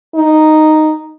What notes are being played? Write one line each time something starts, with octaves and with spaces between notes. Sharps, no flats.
D#4